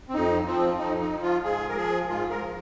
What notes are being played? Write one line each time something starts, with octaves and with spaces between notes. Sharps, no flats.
C4
F2 D#4
F3 C4
F2 D#4
D#4
F3
F4
G#2 G#4
A#4
F3 G#4
G#2 F4
A#4
F3